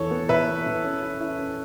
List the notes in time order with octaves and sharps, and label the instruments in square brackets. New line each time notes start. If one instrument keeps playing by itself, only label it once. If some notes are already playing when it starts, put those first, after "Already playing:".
Already playing: [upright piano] E2 E3 [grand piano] A4 C#5
[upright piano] B3
[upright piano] E2 [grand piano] B4 E5
[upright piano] B3
E3
C#4
E4
E4
C#4